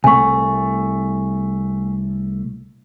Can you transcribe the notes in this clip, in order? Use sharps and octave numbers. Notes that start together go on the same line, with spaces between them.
C2 A3 G#5 C#6